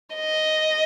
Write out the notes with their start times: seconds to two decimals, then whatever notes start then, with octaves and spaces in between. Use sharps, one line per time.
0.15 D#5